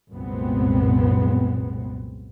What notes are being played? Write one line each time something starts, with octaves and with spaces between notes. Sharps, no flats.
C2 F#2 A#2 G#3 B3 C4